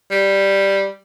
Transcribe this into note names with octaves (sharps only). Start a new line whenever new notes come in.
G3